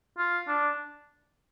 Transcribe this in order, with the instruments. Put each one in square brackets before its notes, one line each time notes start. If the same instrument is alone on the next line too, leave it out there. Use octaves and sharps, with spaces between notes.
[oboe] F4
D4